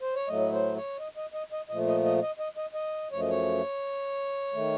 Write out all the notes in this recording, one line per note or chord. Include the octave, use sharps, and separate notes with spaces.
C5
C#5
A2 F#3 A3 D#5
C5
C#5
D#5
D#5
D#5
D#5
A#2 F3 A3 D#5
D#5
D#5
D#5
D#5
D#5
D#5
F#2 F3 A3 C#5
D#5
C#5
D#3 A3